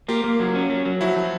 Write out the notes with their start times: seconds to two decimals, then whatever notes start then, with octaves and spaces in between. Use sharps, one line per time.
0.08 A#3 F4 G4
0.24 A#3
0.40 F#3
0.55 C#4
0.70 F#3
0.85 F#3
1.01 F3 E4 F#4
1.16 F3